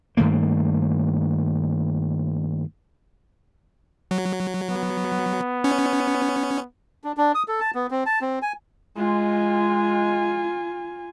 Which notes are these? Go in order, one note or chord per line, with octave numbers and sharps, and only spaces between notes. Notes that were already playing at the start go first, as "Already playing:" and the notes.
G2 D#3 A3 A#3
F#3
B3
C#4
D4
D4
D#6
A4
A5
B3
C4
A5
C4
G#5
G#3 F4 G#5